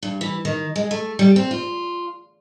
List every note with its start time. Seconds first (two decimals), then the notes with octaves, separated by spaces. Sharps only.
0.03 G2
0.21 E3
0.45 D#3
0.76 G#3
0.91 A3
1.19 G3
1.36 C4
1.51 F4